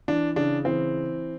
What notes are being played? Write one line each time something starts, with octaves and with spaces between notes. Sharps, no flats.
E3 D4
C#3 D4
E3 C4